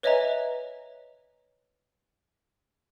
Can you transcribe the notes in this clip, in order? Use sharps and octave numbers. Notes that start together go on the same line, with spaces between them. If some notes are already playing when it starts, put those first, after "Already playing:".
B4 C#5 D#5 E5 G#5 A#5